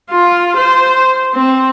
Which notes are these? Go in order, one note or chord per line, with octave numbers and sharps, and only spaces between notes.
F4
C5
C4